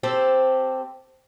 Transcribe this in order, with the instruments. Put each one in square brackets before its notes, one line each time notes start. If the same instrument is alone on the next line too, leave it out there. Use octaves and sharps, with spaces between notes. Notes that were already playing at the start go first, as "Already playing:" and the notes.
[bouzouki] C4 G4 A4 C5